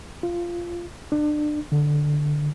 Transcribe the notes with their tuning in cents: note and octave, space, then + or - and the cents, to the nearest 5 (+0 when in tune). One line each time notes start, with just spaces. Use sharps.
F4 -10
D4 +30
D3 +5